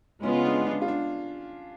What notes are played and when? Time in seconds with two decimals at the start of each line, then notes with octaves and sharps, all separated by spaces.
0.23 C#3 G#3 B3 C#4 F4
0.45 D4
0.67 D4
0.82 F4
0.88 D4